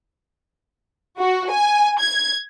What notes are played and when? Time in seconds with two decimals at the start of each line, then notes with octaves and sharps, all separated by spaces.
1.18 F#4
1.49 G#5
1.99 G#6